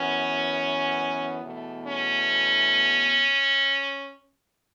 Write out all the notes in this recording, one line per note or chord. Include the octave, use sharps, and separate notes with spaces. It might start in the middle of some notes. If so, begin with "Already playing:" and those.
Already playing: F#2 E3 B3 C#4
E2 B2 A3
C#4